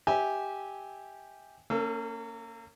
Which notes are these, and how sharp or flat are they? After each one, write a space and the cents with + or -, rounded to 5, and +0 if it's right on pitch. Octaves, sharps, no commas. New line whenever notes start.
G4 +0 E5 -25 G#5 +0
A#3 -30 C#4 +0 A4 +20